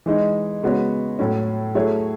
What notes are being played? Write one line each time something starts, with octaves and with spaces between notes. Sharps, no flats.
E3 G#3 D#4
C#3 G#3 B3 F#4 C#5
A2 F#3 C#4
F#3 A3 E4 G#4 C#5